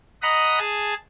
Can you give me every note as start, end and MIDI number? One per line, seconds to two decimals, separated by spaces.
0.22 0.59 75
0.22 0.59 78
0.22 0.59 82
0.22 0.59 83
0.22 0.59 87
0.59 0.94 68
0.59 0.94 80
0.59 0.94 81